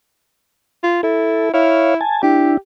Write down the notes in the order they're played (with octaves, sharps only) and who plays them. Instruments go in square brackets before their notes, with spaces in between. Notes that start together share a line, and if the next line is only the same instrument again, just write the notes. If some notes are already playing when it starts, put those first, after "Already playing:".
[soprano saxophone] F4
[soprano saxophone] E4 [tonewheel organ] A4
[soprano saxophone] E4 [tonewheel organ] C#5 F5
[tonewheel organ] G#5 A5
[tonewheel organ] D4 E4 [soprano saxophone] G4